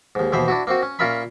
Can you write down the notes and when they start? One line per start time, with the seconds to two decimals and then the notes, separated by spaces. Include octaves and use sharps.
0.15 D#2 G#2
0.32 D#2 B2 E3 C5 E5
0.48 D4 E4 F#4
0.67 A#3 C4 F#4
0.82 C#4
0.99 A#2 C#4 F4 A#4 E5 B5